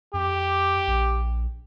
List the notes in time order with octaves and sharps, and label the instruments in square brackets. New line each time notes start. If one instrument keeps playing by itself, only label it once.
[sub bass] F2 [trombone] G4
[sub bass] A#1